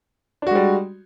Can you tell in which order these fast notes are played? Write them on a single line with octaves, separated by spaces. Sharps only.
D4 F#4 G#3 G3